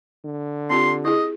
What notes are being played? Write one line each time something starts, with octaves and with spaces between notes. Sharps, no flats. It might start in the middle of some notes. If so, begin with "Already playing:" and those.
D3
C4 F4 G4 C6
E4 G#4 D#5